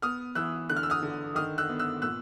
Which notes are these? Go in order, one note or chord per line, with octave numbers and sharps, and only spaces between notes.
B3 D#6 F6
E3 E6 F#6
D3 F#6
F6
E6
D#6 F6
D3
D#3 D#6 F6
E6 F#6
B3
E6 F#6
A#2 E6 F#6